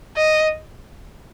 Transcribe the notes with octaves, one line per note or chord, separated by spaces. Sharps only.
D#5